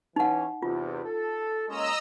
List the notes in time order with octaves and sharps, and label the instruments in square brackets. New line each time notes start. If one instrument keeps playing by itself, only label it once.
[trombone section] E3 C#4 [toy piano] D#4 F#5
[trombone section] E2 C3 [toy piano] F4
[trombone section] A4
[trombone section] G#3 A#3 C#4 [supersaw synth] D#5 A#5 E6